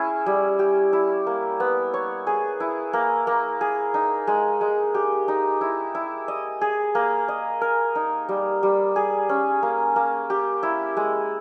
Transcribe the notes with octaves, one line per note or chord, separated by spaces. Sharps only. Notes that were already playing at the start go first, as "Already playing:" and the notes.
Already playing: C#4 E4 G#4
G3
G4
E4
A#3
B3
C#5
G#4
E4
A#3
A#3
G#4
D#4
G#3
G#3
G4
D#4
E4
E4
D#5
G#4
A#3
D#5
A#4
D#4
G3
G3
G#4
C#4
A#3
A#3
G4
E4
G#3